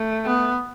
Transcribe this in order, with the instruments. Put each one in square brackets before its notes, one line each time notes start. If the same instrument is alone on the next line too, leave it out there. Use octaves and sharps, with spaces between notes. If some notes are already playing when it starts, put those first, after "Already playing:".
Already playing: [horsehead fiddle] A3
[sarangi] B3